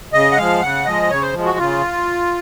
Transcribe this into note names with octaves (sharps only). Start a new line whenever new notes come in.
C#3 D#5
F#5
F3 G#3 F5
C#3 F#5
F3 G#3 D#5
C#3 C#5
C5
F3 G#3
F#4
C#3 F4